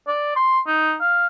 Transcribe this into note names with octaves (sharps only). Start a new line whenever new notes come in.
D5
C6
D#4
F5